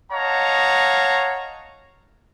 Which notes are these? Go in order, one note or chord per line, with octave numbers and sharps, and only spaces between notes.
C#5 D#5 F5 F#5 A5 A#5